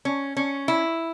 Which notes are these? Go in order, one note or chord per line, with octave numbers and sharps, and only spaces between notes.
C#4
C#4
E4